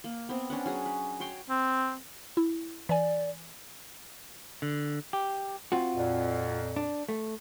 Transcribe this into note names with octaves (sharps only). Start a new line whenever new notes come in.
A#3
B3 C4
C#4 D4 F#5
F#3 G#4 A#5
B4
F#4 C#5 G5 C6
C4
E4
E3 D5 G#5
D3
G4
C4 F4 F#4
F2 A#2
D4
A3